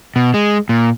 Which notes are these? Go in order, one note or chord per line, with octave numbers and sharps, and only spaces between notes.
B2
G#3
A#2